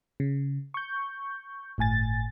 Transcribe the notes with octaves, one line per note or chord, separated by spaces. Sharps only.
C#3
C#6 G6
G1 A2 G#5 A6